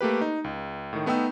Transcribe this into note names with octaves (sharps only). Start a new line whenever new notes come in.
A3 A#3 G4 B4
D#4
C#2
A2 D#3
A3 B3 D#4 G5 E6